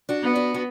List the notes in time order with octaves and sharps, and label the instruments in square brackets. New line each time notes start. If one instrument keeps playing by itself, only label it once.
[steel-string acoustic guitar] D4 F#4
[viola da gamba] B3
[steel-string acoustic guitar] D4 F#4
F#4